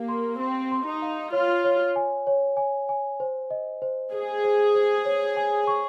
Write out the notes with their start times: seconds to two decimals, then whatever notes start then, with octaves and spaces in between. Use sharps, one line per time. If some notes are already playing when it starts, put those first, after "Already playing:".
Already playing: A#3 G4 F5
0.08 C6
0.40 C4 C6
0.72 C6
0.86 D#4
1.02 F5
1.32 F4 C#5
1.64 C#5
1.96 G#5
2.27 C#5
2.57 G#5
2.89 G#5
3.20 C5
3.51 D#5
3.82 C5
4.12 G#4 C5
4.44 C5
4.75 C5
5.05 C#5
5.37 G#5
5.67 C#6